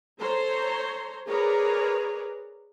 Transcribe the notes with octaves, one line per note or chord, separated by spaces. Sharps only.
A4 C5 C#5 A#5 C6
G#4 A#4 B4 C#5 D5